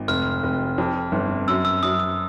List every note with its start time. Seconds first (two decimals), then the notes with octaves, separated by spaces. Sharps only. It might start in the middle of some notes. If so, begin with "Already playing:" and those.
Already playing: G#1
0.08 F1 F6
0.43 F1
0.78 F2
1.12 G1
1.48 F#2 E6
1.65 E6
1.83 F#2 D#6
1.99 D#6